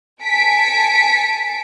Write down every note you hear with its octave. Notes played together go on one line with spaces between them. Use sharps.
G#5 A5 B6 C#7 D7